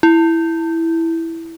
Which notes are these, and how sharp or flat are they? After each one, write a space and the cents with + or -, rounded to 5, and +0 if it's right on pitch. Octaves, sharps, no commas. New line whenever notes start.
E4 +0